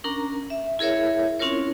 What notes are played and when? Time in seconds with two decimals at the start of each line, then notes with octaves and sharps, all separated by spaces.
0.04 C#4 D4 A#4 A#5
0.50 E5
0.79 E4 G#4 A#4 C#5 E5
1.39 C4 C#4 E4 F4 A#4 C#5